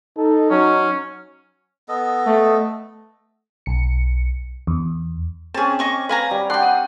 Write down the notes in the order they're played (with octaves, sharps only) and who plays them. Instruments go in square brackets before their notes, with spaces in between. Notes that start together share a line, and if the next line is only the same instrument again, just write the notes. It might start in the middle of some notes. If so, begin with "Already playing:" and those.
[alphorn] D#4 [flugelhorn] A4
[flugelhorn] F#3 [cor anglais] C#4
[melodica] B3 A4 D#5
[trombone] A3
[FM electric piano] B1 C#7
E2
[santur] C4 C#4 [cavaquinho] G#4 A5
[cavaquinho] D#5 C#6 D6
[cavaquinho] B4 G#5 A#5 [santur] F5
[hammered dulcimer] G3
[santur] D4 [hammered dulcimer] F#5 [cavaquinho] G5 C6
[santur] D#6